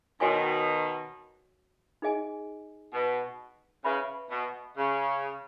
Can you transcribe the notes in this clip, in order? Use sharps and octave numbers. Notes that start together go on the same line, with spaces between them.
B2 D#3 F#4 C#5 G#5 C#6
D#4 G#4 D#5 G#5
B2
C#3 B4 E5 B5
B2
C#3